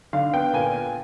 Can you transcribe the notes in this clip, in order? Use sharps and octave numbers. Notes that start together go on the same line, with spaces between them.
D3 F5
B3 G5
A#2 G#5